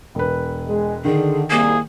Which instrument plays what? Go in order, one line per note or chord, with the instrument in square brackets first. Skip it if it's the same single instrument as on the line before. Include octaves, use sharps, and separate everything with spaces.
[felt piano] E1 B4
[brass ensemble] G#3
[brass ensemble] D3 [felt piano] D#3 [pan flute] G#4
[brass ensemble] C2 [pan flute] A#3 [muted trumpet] G#4